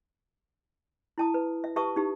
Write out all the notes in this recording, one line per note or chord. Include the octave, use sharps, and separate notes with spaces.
E4 A5 D#6
B4
E5
G4 B4 E5 A5 C#6 D#6
D#4 G4